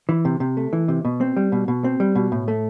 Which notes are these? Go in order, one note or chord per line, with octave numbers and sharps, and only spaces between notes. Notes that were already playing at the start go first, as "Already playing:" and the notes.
E3
C3
C3
A3
E3
C3
B2
C4
G3
B2
B2
C4
G3
B2
A2
A3